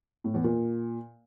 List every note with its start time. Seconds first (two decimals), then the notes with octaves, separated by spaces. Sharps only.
0.24 A2
0.34 E2
0.44 A#2